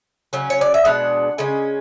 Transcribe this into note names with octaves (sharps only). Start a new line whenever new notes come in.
C#3 F#3 C#4
C#5
D5
E5
B2 G#3 D4 F#5
C#3 G#3 C#4